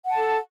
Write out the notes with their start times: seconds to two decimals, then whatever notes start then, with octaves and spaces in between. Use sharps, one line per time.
0.06 F#5
0.10 A5
0.15 A4